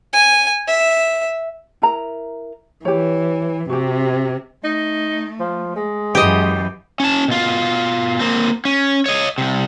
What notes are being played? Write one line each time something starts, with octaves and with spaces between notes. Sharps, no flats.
G#5
E5
E4 A#4 A#5
E3 G4 C#5
C3 F#4 G4
A3 D#4
F3
G#3
F#2 E3 G4 D#5
C#4 A5
B2 F4
A#3 C4
C#4
C#5 D#5
C2 C3